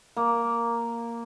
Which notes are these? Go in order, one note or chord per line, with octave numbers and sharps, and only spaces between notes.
A#3